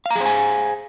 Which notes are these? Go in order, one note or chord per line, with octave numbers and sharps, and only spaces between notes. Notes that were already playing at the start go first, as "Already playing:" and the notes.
G#4 C5 F5 G#5 A#5